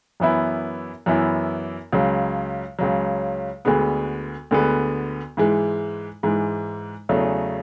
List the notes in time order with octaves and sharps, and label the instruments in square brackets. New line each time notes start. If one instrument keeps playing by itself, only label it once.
[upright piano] F#2 E3 B3 E4
F#2 E3 B3 E4
C#2 C#3 F#3
C#2 C#3 F#3
D2 D3 G#3 B3
D2 D3 G#3 B3
G#2 E3 G#3
G#2 E3 G#3
E2 C#3 F#3 A3